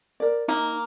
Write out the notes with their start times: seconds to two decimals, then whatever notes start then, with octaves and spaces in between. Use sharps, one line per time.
0.20 A#4 D5
0.48 A#3 D#4